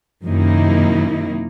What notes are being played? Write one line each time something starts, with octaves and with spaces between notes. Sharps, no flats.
F#2 C3 D#3 A#3 D#4 E4